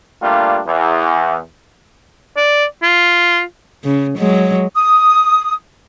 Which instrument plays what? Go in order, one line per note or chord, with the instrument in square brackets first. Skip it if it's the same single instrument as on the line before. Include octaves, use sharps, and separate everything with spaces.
[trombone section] G3 A3 A#3 D4 F4
E2
[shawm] D5
F4
[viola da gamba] C#3
F#3 G#3
[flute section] D#6